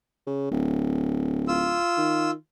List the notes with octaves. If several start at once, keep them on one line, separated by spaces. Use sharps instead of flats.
C#3
D1
F4 E6
D#3